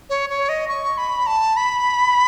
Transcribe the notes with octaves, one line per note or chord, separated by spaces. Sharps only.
C#5
C#5
D#5
C#6
B5
A5
B5